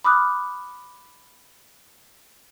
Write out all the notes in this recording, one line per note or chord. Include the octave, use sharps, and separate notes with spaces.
B5 D6 D#6 F6 F#6